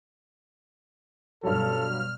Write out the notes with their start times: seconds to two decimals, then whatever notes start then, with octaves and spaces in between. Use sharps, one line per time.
1.43 G2 B2 F#3 A4 F6